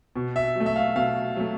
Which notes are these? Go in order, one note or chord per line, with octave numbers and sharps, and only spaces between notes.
B2
E5
F#3 A3
E5
F5
B2 F5
F#3 A3